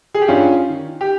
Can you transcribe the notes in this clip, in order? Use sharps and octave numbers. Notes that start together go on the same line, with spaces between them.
G#4
G4
G2 C#4 F4
D#3
G4